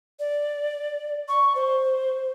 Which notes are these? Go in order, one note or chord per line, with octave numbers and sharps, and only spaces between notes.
D5
C#6
C5